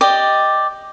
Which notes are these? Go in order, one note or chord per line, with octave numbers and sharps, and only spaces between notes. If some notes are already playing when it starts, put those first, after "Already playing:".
G4 D5 D#5